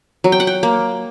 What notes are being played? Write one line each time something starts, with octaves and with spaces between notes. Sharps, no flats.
F#3
G5
F#5
G5
A#3